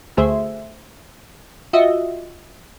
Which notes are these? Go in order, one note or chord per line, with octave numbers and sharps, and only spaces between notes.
D2 A3 G#4 C5 E5
F4 F#4 D#5 E5